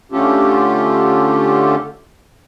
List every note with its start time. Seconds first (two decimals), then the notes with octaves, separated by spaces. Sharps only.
0.12 D3 A3 C#4 F4 G4 A4